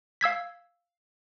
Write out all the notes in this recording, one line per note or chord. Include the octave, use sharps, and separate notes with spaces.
F5 E6 G#6 B6